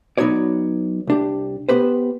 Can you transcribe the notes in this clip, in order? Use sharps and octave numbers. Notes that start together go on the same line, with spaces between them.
F#3 B3 D#4 F#4 C#5 D5
C2 D4 G4
B3 G4 B4 C5